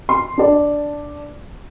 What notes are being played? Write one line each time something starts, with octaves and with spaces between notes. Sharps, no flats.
C6
D4 D5